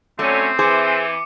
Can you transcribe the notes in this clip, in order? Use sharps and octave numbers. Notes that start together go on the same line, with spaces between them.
D3 F#3 A3 C4 C#4 D6 D#7
E3 G#4 C5 D6 C#7